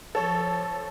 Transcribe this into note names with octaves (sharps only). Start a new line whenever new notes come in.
F3 A4 C#5